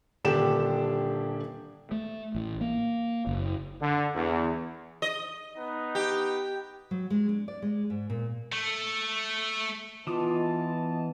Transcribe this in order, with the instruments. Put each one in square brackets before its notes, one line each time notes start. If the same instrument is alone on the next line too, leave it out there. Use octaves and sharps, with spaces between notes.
[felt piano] D#1 D3 D4 G4 G5 E7
[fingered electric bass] A3
A1
A#3
F#1
[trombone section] D3
E2
[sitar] D#5
[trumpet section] B3 D#4
[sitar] G4
[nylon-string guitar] F#3
G#3
D4
D5
G#3
G#2
A#2
[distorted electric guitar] A3
[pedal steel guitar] E3 D6 D#6 [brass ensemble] B3 D#5 A5 [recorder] F4